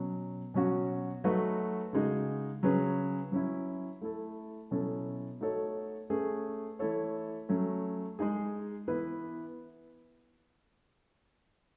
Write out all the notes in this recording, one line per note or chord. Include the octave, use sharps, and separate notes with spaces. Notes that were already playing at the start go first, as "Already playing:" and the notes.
Already playing: B2 F#3 C#4
B2 F#3 C#4 F#4
F#3 A3 D#4 F#4 B4
C#3 G#3 D#4 F#4
C#3 F#3 C#4 G#4 B4
F#3 C#4 E4
A3 E4 A4
B2 F#3 C#4 E4 A4
A3 D#4 F#4 A4 C#5
A3 C#4 G#4 B4
E3 A3 E4 A4 C#5
F#3 A3 C#4
G#3 D#4 G#4
E3 B3 E4 B4